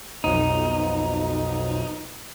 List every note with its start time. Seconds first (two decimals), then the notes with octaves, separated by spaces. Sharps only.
0.24 B1 F2 D#4